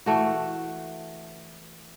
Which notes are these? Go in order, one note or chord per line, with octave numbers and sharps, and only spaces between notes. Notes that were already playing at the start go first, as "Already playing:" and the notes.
E3 A3 F#4